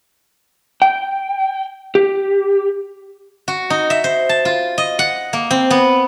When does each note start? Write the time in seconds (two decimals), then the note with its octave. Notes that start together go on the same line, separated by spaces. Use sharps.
0.82 G5
1.95 G4
3.48 F#4
3.70 D#4
3.90 E5
4.04 C5
4.29 A5
4.45 F4
4.78 D#5
4.99 F#5
5.33 A#3
5.51 C4
5.70 B3